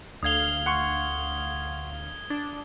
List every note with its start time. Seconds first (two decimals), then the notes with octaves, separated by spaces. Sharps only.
0.23 D2 F5 D#6 G#6 G7
0.66 F#5 C6 C#6
2.30 D4